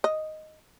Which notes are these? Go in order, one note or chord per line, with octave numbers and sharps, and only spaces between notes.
D#5